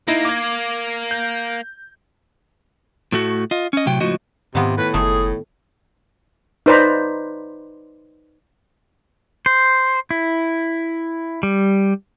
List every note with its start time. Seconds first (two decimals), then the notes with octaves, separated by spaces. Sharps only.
0.08 A#3 D#4 E4 A#6
0.25 D6 G#6
1.11 G6
3.12 A2 A3 F#4
3.51 F4 D#5
3.73 C#4 D#5
3.86 A2 C3 F#3 G5
4.00 C#2 A2 F3 F#4 D#5
4.55 G#2 C3 D#3 B3 F4
4.77 A2 B4
4.94 F#1 D#3 A3 G#4
6.66 D#4 B4 C5 D5 A#5 B5
9.46 C5
10.11 E4
11.43 G3